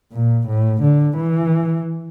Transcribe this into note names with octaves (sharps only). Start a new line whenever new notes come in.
A#2
A2
D3
E3